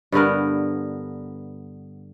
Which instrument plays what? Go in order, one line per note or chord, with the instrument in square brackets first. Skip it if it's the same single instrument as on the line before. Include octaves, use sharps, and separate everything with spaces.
[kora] G2 D3 B3 A#4